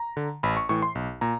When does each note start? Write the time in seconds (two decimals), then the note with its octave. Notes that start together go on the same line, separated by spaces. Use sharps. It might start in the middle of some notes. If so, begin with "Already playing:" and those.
Already playing: A#5
0.17 D3
0.43 A1 B5
0.57 C#6
0.69 A2 E3 C#6
0.82 C6
0.95 B1
1.21 A#2 A#5